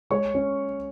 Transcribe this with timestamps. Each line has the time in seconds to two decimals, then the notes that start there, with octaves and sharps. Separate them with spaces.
0.10 G#3 C#5 C#6
0.34 C#4